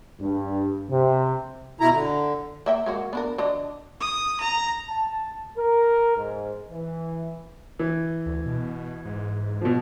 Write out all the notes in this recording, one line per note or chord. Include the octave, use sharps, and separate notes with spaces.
G2
C3
B2 E4 A#5
D3
A#3 E5 G5
G#3 A#3 F#4
B3 D4 A#4
D3 D4 D#5
D#6
A#5
A5
A#4
G#2
E3
E3
D2
B2
G#2
B2 F3